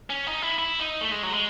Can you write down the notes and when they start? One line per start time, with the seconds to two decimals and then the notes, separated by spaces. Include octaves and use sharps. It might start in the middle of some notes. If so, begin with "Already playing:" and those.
0.10 C#4
0.27 D#4
0.42 E4
0.59 E4
0.80 D#4
1.01 A3
1.11 G#3
1.23 F#3
1.34 G#3